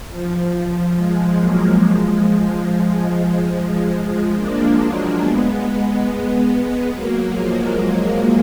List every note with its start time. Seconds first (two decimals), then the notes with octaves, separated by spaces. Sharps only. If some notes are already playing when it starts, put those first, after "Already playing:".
0.10 F3
0.95 F3 G#3
1.38 F#3 A#3
1.80 F3 G#3
4.35 A#3 D4
4.77 F#3 A#3
5.20 G#3 B3
6.89 F#3 A#3
7.32 F3 G#3
7.75 F3